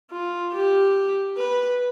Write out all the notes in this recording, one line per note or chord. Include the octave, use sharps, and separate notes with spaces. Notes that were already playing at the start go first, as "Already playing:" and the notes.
F4
G4
B4